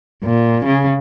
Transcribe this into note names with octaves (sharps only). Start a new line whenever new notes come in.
A#2
C#3